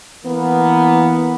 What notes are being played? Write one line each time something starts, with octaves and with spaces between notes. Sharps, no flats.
E3 A#3 B3